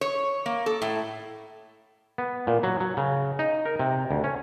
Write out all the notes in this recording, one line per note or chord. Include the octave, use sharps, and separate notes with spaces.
C#5
A#3
A4
A2
B3
A#2
F#3
F#3
C#3
D#4
A#4
C3
D2
C#4